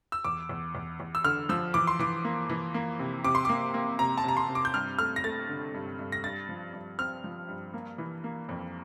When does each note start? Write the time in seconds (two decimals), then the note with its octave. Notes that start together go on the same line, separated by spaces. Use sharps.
0.12 E6
0.24 E2 D6
0.49 E2
0.75 E2
1.00 E2
1.15 E6
1.24 D3 F6
1.49 F3 E6
1.74 E3 D6
1.87 C6
1.99 E3 D6
2.25 A#3
2.50 E3
2.74 A#3
2.99 C3
3.24 C3 D6
3.35 C6
3.45 A#3 D6
3.74 A#3
3.99 C3 A#5
4.18 A5
4.24 C3 A#5
4.37 C6
4.49 C3
4.55 D6
4.65 G6
4.74 G2 F6
4.99 A3 F6
5.16 A#6
5.24 A3 A6
5.49 D3
5.74 G2
5.99 G2
6.12 A#6
6.24 G2 A6
6.49 F3
6.74 G2
6.99 C4 F6
7.24 F3
7.49 G2
7.74 A#3
7.98 E3
8.24 A#3
8.49 F2